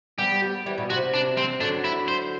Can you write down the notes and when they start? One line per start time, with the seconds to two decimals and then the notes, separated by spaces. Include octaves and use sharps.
0.18 G3 B3 G4
0.42 G3 B3
0.66 E3 G3
0.78 B2
0.90 C3 F#4
1.14 D4
1.37 C4
1.61 D3 F#3 D4
1.84 E4
2.08 C5